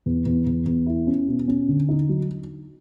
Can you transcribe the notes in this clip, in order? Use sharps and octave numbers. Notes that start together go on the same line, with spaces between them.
E2
E2
E2
E2
E4
C#4
B2
C#4
D3
D#4
F#3